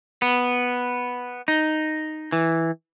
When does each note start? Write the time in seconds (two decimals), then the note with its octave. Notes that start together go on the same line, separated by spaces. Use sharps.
0.22 B3
1.48 D#4
2.32 E3